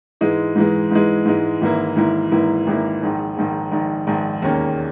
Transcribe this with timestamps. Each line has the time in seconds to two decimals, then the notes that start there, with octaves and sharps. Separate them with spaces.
0.21 G#2 E3 G#3
0.56 G#2 E3 G#3
0.91 G#2 E3 G#3
1.25 G#2 E3 G#3
1.61 G#1 G#2 E3 A#3 E4
1.96 G#1 G#2 E3 A#3 E4
2.31 G#1 G#2 E3 A#3 E4
2.67 G#1 G#2 E3 A#3 E4
3.02 A#1 G#2 D#3
3.37 A#1 G#2 D#3
3.72 A#1 G#2 D#3
4.07 A#1 G#2 D#3
4.42 E1 D#2 D#3 A#3 C#4